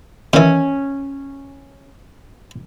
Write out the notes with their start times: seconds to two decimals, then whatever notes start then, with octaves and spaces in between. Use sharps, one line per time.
0.33 D#3 E3 C#4